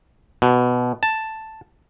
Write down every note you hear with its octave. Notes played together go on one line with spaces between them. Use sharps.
B2
A5